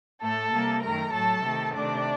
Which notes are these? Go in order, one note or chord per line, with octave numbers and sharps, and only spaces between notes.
A2 A3 A4 A5
C3 G3 A#3
F#2 D#3 A3 A#4 A#5
A2 F#3 A3 A4 A5
C3 D#3 A3
C3 D#3 A3 D4 D5